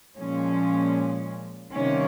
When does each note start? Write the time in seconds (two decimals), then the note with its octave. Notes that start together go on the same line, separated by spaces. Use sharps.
0.17 A#2 F3 G#3 C#4
1.72 C3 D#3 G3 A#3 C#4